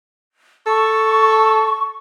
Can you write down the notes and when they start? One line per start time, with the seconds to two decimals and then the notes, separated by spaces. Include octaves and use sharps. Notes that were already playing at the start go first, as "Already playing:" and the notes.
0.66 A4 C#6